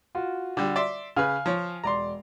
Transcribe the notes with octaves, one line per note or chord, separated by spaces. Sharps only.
F4 F#4
D3 G3
D5 E5 C6
C#3 B4 F5 G#5 F6
F3 C#5
E1 D5 A#5 C6